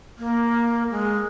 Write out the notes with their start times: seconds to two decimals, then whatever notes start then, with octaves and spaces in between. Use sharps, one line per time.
0.18 A#3
0.91 G#3